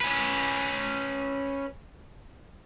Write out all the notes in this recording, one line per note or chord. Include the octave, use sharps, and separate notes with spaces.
C#4 B4